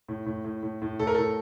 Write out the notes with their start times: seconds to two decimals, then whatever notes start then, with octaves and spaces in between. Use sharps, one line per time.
0.09 A2
0.26 A2
0.44 A2
0.63 A2
0.82 A2
0.99 A2 A4
1.07 A#4
1.14 A2 A4